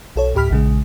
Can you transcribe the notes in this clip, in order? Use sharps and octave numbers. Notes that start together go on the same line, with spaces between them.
B1 A4 C#5
D2 A2 G4 B5 F6 B6
A#1 C#3 G#3